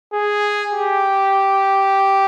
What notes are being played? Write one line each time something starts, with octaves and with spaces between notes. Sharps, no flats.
G#4
G4